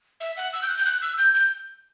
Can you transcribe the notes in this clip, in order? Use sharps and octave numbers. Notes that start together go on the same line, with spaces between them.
E5
F#5
E6
G6
F#6
G6
F#6
E6
G6
G6